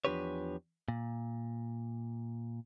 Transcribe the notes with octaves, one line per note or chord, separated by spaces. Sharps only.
E2 F3 D4 G4 B4 C#5
A#2